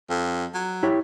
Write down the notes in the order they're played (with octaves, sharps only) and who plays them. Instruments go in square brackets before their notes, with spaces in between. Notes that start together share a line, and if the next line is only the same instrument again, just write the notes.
[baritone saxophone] F2
F#3
[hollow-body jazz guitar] E4 G4 C#5